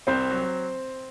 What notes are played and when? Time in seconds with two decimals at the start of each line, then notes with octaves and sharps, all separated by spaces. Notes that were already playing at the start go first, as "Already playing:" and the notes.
0.07 C2 C4 C5
0.31 F#3